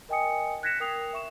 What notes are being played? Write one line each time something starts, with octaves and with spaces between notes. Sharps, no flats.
A#4 D#5 G5 G#5 D#6 C#7
F#6 G#6 A#6 B6 C#7 E7
A#4 G5 D#6 C7 F7
E5 C#6 E7